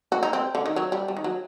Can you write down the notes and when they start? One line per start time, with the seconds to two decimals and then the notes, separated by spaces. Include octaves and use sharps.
0.12 F#4
0.23 D#4
0.33 C4
0.55 D3
0.66 D#3
0.76 F#3
0.92 G3
1.08 G3
1.17 D#3
1.24 F#3